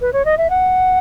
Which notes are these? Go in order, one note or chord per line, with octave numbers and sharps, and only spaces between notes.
B4
C#5
D#5
E5
F#5